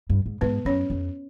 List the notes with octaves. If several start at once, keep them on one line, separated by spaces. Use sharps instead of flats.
G2
G#2
G#2 B3 B4
F#2 C#4 C#5
F2